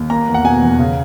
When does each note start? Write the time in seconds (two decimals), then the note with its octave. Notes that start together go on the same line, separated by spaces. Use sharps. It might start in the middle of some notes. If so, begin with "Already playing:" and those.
Already playing: D#2
0.10 A#3 A#5
0.28 E2
0.34 F#5
0.44 B2 G#5
0.62 E2
0.79 C#3